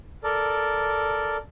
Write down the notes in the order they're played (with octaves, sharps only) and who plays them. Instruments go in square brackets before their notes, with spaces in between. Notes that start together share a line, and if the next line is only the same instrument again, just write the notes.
[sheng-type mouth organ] A4 A#4 D5